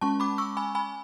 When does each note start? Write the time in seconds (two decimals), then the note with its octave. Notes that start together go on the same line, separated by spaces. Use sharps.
0.01 G#3 C#4 A5 C#6
0.20 B5 D6
0.38 C#6 E6
0.57 G#5 B5
0.75 G#5 B5